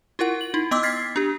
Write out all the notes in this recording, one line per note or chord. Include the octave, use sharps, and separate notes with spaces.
E4 F4 A#4 F#5
F#7
D#4 E4
B3 D#5 C6 D6 E6
F6 G#6 A6 B6 C7
D4 G4